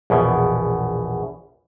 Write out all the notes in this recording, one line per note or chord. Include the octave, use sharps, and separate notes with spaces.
A#1 E2 B2